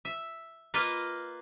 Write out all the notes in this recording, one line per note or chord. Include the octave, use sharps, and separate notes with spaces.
E5
A#3 F4 B4 D#5